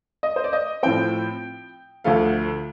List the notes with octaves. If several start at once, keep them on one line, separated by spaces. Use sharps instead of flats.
D#5
C5
D5
D#5
A2 F3 C4 G5
D2 D3 F3 A3 F5